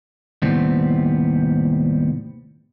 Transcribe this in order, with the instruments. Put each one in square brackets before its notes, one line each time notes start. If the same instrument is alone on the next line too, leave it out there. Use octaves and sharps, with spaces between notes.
[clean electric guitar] D#2 A2 C3 G3 B3 C4